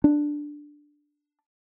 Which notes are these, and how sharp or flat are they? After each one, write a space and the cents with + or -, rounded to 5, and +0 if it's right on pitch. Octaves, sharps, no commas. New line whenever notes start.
D4 +0